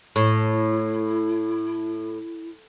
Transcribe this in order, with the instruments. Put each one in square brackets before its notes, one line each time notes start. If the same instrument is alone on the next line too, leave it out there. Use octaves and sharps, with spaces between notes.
[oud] A2 [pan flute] E4